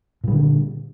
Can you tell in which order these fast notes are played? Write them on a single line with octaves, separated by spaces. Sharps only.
A#2 G3 D3